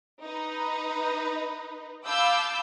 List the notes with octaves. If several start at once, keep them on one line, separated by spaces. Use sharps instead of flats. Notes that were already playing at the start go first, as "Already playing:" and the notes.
D#4 B4
F5 A5 B5 D6 E6 G6